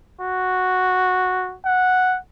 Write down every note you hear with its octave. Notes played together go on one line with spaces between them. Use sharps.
F#4
F#5